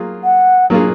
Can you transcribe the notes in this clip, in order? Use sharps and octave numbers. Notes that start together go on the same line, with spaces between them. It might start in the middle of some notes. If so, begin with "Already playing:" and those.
Already playing: F#3 A#3 F4 G#4
F#5
F#3 A#3 F4 G#4